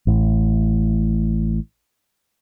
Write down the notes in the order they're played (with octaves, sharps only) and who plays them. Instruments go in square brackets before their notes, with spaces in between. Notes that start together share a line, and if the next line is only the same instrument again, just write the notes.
[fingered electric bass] A1 A2